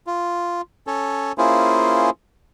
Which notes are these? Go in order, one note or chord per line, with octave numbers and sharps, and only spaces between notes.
F4
C#4 A4 C#5
A#3 C#4 E4 F4 G#4 C5